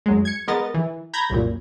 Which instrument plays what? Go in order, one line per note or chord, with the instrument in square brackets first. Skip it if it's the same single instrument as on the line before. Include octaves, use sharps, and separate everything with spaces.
[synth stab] F#2 F#3 G#3
G#6 C#7
G#3 B3 A#4 D#5 A6
E3
A#5 B5 G6 G#6 A#6
C2 F#2 A#2